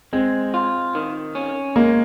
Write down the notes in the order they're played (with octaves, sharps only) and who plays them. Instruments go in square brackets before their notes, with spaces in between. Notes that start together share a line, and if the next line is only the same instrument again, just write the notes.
[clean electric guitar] G#3 [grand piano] C4
[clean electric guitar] F4
D#3
C#4
[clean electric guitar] G#3 [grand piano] A#3